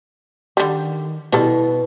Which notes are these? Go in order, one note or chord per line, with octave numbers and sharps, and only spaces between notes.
D3 D#3 G3
B2 G3 E4 A4